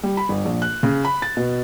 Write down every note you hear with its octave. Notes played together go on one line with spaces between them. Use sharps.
G3
B5
G1
A#1
F#6
C#3
B5
A6
B2